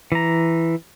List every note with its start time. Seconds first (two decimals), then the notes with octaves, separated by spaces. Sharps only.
0.12 E3 A#5